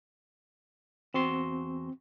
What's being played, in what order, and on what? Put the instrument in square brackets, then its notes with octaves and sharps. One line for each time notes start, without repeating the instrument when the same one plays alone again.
[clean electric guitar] E2 F#4 C6 [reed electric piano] C4